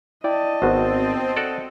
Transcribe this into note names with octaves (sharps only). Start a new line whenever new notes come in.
E4 D5 D#5 G5 A5
G#1 B3 C4 F#4 C5
F#4 A4 D5